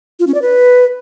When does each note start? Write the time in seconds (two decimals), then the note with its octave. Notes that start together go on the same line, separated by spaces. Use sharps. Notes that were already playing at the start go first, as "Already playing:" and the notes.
0.20 F4
0.27 C#4
0.34 D5
0.42 B4